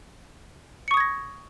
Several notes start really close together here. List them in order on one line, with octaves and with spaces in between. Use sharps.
C#7 C#6 D#6 G#6 A#6